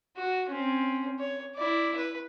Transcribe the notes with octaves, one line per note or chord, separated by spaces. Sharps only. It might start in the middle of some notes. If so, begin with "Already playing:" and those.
F#4
C4 C#4
C#5
E4 D5
B4